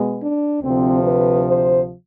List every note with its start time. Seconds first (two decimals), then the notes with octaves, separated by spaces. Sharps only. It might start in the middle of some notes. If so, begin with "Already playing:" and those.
Already playing: B2 G#3 B3
0.22 D4
0.63 D2 C3 F3 C4
1.04 B4
1.45 C5